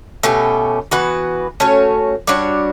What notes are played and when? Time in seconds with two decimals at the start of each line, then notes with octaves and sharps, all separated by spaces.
0.23 B2 A3 C#4 G4
0.91 E3 B3 F#4 B4
1.60 A3 C#4 F#4 C#5
2.27 G3 D4 F#4 C#5